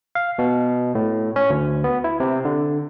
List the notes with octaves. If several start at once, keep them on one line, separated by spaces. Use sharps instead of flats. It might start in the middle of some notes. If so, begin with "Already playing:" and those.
F5
B2
A2
C#4
D2
B3
E4
C3
D3